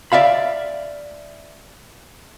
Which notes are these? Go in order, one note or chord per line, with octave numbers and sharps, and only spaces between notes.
D5 E5 F5 B5